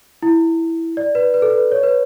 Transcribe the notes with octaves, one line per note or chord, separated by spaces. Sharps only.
E4
D5
B4
B4
A4
B4
C#5
B4